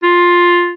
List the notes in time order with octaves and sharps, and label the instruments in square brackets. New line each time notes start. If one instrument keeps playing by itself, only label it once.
[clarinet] F4